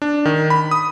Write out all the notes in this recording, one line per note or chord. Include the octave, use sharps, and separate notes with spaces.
D4
D#3
B5
D#6